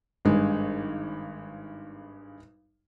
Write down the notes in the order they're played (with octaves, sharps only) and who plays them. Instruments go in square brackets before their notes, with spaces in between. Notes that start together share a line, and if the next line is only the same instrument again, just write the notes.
[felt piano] G#1 G2 G#3